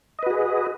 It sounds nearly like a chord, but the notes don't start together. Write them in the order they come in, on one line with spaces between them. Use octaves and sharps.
D#5 B4 F#4 G#4